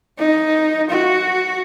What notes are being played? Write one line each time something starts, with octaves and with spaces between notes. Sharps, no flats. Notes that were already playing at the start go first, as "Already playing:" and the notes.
D#4
F#4